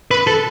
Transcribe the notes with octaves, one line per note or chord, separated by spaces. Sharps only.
B4
A4